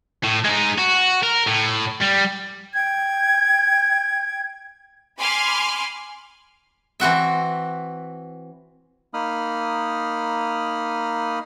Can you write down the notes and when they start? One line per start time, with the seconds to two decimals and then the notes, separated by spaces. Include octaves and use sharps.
0.24 A2
0.45 G#3 D#4
0.78 F#4
1.23 A#4
1.48 A2
2.02 G3
2.74 G5 G#6
5.18 G#5 B5 C6 D6 F6
7.00 E3 C4 F#4 E5
9.14 A#3 D#4 B5 D#6 F6